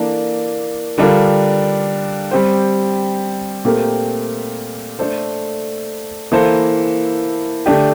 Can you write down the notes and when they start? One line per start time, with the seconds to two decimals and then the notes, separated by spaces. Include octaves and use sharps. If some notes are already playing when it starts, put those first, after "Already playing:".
Already playing: E3 A#3 D4 A4
0.98 D3 G3 D4 F4 A#4
2.31 G3 C4 G4 C5
3.65 A#2 A3 C4 G4 A#4
4.99 A3 D4 A4 C5
6.32 E3 A#3 E4 A4 C5
7.66 D3 A3 D4 G4